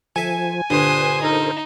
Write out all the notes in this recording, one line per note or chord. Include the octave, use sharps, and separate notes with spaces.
F3 A4 E5 G#5
G2 A#2 D3 B4 C5 D#6
D#4 A4 A#4 C5